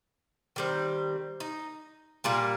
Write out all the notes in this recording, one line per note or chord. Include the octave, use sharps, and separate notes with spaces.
D#3 G3 C4
D#4
A#2 G3 A#3 F4